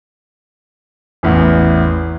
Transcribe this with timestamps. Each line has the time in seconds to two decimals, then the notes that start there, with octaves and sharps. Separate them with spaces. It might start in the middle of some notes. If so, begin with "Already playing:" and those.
1.23 A1 E2